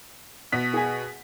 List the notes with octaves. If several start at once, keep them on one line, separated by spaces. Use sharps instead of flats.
B2 B6
G#4 G#5